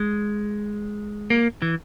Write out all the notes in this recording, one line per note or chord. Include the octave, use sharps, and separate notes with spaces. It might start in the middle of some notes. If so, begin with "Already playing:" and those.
Already playing: G#3
A#3
E3